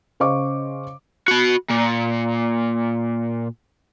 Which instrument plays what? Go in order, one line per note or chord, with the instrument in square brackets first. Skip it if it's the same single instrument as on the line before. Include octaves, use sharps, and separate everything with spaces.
[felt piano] C#3 C5 D#5 F5 C#6 D6
[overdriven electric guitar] F#4 B5
A#2